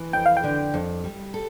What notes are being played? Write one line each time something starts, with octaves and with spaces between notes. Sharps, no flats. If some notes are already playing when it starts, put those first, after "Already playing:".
Already playing: E3
F2 G5
F5
G5
D3
F2
G3
A4